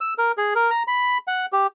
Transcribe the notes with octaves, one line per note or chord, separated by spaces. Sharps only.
E6
A#4
G#4
A#4
A#5
B5
F#5
G4